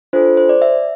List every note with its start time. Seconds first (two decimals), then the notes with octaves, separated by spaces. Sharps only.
0.13 D4 F4 A4 C5
0.37 C5
0.49 D5
0.62 E5